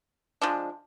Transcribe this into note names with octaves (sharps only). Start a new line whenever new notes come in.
F3 G#3 D4